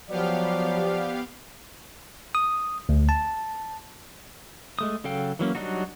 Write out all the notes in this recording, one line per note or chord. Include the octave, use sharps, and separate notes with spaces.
F3 F#3 B3 G4 D5 F5
D#6
D2
A5
G#3 A3 D#6
C#3 F#3 A4 F5 G5
E3 F#3 A#3 C#4
F#3 G3 D4 D#4 F#4